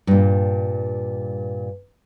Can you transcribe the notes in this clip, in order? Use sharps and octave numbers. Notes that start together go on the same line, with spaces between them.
G2 A#2